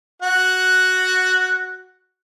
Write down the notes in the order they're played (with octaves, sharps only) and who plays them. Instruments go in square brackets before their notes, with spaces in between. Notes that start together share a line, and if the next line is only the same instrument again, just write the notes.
[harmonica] F#4 F#5